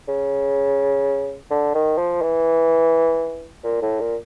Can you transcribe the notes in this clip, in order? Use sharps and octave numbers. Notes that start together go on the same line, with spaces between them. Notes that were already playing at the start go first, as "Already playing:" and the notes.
C#3
D3
D#3
F3
E3
A#2
A2
A#2